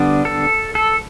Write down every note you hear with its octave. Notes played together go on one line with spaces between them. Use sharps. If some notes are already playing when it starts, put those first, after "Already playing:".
Already playing: D3 G3 B3 D4
A4
A4